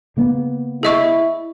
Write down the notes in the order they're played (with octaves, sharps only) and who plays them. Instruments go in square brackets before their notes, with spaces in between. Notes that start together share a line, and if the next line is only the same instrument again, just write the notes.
[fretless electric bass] C#3 A#3 B3
[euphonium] E4 [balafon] G#4 D#5 C#6